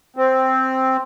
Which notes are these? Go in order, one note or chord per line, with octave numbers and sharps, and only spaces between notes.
C4